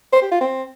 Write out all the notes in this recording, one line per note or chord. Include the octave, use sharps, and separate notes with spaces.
C5
G4
F4
C4